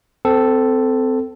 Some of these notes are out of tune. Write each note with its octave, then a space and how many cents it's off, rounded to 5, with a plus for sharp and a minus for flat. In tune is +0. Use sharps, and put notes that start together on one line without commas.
C4 -20 A4 +0